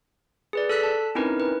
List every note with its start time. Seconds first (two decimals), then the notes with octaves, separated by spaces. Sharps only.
0.53 G#4 B4 D5
0.69 A4 E6 F#6 B6
0.83 A5
1.15 C4 C#4 D#4 E4 A#4 B4
1.40 B4